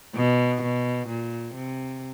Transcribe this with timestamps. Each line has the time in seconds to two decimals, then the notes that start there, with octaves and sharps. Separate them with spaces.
0.15 B2
0.62 B2
1.08 A#2
1.54 C3